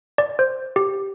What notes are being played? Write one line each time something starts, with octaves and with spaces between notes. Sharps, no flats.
D5
C5
G4